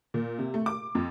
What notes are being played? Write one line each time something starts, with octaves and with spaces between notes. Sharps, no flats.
A#2
C3
A3
D6
F2